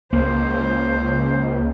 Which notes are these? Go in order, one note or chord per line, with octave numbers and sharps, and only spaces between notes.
C#2 A#3 C5